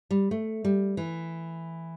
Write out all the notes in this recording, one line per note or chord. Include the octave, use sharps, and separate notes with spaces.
G3
A3
G3
E3